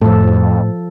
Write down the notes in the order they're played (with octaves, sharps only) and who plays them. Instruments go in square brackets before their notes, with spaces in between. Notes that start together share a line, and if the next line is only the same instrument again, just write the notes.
[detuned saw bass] F2 [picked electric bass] A2 [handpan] F3 A4